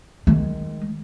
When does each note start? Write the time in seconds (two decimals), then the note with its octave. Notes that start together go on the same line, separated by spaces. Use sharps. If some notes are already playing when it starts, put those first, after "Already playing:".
0.27 D#3 G#3